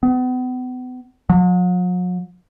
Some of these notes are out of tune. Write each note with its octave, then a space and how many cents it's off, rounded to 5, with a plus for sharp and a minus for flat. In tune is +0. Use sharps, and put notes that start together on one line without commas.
B3 +35
F#3 -45